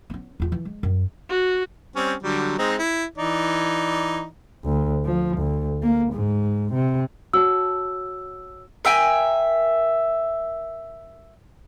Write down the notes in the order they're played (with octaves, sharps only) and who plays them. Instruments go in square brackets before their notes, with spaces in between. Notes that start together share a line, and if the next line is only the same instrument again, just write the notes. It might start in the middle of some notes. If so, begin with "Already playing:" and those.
[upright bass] B3 C#4
E2 F4
E3
G#3
F#2
[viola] F#4
[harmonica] G3 C4 C#4
D3 F#3 G3
G#3 C4 D#4
E4
E3 D#4 D5
[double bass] D2
F3
D2
A#3
G#2
C3
[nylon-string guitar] F#4 C#5 A5 [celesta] E6
[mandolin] A#4 E5 G5 G#5